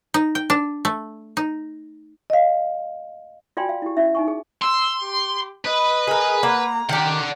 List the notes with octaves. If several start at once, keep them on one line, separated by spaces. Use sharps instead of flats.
D#4
G5
D4
A3
D#4
D#5 F5
F4 F#4 D5 G5 G#5 C6
F5
E4 G4
C#4 E4 E5
D#4 G#5 C#6
G#4
C6 E6
G4
B4 D#5
G#4 A#4
A#3 F#5 A#5
D#3 G4 D5 F#5